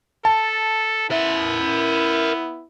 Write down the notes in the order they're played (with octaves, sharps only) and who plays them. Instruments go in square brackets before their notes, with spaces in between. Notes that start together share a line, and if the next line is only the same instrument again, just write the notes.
[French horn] A4 [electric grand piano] A5
[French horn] B3 [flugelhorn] E4 [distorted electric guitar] A#4 E5